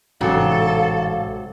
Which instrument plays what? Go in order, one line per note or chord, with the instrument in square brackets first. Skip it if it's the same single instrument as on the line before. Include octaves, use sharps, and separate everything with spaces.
[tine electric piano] A1 [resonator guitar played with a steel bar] G#2 C3 F#3 [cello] A4 [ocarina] F5